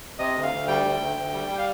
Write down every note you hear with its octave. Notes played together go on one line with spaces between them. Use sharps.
C3 D#5
D2
F5
D2
G3 G5
D2
D2
D2
G3
G3
F5